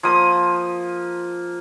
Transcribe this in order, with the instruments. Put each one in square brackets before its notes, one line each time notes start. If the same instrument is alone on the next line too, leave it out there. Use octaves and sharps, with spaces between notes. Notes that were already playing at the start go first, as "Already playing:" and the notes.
[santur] F3 A#3 D#6